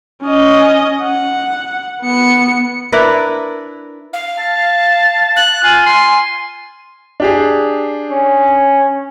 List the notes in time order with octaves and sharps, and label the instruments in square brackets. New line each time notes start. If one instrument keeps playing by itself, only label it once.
[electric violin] C#4 D#5
F#5
B3 C#7
[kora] D4 E4 A#4 B4
[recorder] F5
[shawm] A5
[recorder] F#6
[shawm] F4 [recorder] G#5
[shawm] C6
[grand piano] D4 G4 G#4
[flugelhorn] C#4